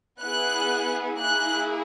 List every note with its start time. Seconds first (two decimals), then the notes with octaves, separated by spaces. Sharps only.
0.20 B3 E4 G#4 F#6
1.19 A#3 E4 G#4 F#6